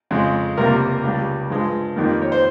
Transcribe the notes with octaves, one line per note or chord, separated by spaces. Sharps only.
F2 C#3 G#3
C#2 C3 G3 A#3 A#4
C#2 C#3 G3
G2 F3 G#3
F2 D#3 G3 A#3
C#5
C5